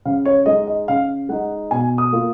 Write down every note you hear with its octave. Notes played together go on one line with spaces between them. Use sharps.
C#3 F5
C#5
G#3 D#4 D#5
D#5
C#3 F5
G#3 D#4 F#5
B2 G#5
D#6
A#3 F4